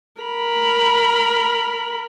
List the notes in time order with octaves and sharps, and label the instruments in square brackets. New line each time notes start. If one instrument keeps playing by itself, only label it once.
[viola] A#4 B5